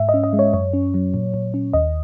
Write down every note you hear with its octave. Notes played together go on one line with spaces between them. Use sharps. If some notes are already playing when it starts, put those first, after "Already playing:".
Already playing: G#2 E5
D#5
C#4
D#5
G#3
C#5
F#2 C#5
C#4
F#3
A#2
A#2
C#4
D#2 D#5